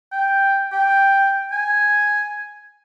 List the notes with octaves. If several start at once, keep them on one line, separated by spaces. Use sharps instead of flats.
G5
G5
G#5